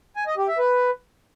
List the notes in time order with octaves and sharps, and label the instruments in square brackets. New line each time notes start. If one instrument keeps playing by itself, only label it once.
[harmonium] G#5
D#5
G4
E5
B4